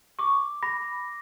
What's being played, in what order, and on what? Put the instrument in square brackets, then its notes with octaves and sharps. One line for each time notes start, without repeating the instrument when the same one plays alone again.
[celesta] C#6 [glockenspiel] D6
[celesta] B5 [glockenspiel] A#6